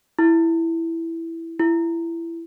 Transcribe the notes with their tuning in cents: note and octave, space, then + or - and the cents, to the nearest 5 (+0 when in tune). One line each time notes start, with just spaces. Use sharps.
E4 +5
E4 +20